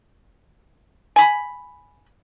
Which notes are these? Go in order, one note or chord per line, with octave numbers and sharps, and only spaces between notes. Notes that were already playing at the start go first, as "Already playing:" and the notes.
G#5 B5